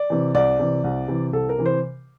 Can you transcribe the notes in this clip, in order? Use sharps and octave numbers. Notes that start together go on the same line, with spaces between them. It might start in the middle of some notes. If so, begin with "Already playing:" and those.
Already playing: D5
C3 E3
C2 D5
C3 E3
C2
C3 E3
C2 A4
A#4
C3 E3
C5